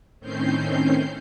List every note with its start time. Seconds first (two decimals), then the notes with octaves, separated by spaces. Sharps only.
0.20 A2 D#3 C4 C#4 G6 C7